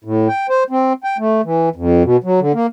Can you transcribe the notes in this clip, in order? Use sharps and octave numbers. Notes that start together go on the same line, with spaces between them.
A2
G5
C5
C4
G5
A3
E3
F2
B2
F#3
D3
A#3